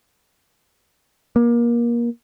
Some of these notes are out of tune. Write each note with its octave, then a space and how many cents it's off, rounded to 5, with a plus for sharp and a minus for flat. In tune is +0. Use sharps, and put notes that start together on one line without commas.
A#3 +25